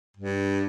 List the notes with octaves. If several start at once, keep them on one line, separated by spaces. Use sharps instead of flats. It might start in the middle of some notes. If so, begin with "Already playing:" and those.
G2